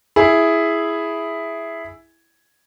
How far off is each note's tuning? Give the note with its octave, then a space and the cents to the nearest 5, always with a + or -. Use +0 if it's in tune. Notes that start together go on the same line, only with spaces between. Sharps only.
E4 +0 G#4 +0